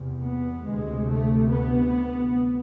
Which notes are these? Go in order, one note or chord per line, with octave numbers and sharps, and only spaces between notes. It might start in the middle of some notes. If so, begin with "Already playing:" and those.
Already playing: E2 C3
B3
D2 C3 G#3
A3
B3